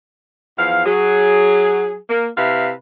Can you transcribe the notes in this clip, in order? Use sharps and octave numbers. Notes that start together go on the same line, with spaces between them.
E2 F3 F5
F#3 G#4
A#3
C3 E4 B4 F5